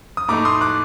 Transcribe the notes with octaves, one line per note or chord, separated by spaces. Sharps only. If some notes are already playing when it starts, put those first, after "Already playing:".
D#6
A2 A3 D#4 A#5 D6
C6 D#6
D6 F#6